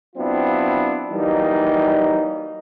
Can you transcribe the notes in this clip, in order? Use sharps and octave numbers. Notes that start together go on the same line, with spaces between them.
F#3 B3 C4 D4 E4 F4
E3 F#3 G3 A#3 D#4